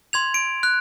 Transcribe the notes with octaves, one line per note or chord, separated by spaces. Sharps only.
C6 G#6 F7
D7
F#6